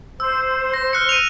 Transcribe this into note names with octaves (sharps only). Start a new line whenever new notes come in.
C5 E6
A#6
F6 F#6 C#7
D#7 F7